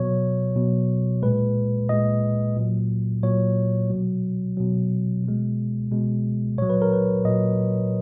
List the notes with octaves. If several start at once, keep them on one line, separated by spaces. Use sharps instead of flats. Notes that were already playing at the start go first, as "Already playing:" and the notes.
Already playing: B2 F#3 C#5
B2 F#3
A#2 G#3 B4
A#2 G#3 D#5
A#2 F#3
A#2 F#3 C#5
B2 F#3
B2 F#3
B2 G#3
B2 G#3
A#2 F#3 C#5
B4
A#4
B4
A#2 F#3 D#5